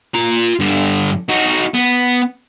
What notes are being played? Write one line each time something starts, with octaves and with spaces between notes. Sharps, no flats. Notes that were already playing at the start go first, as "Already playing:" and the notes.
F4 A#5
G2 D3
D#4 F#4
B3